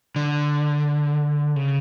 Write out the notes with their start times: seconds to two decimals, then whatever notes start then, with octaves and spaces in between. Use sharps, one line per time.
0.16 D3
1.56 C#3